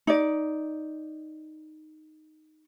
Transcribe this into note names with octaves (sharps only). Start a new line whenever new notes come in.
D#4 D5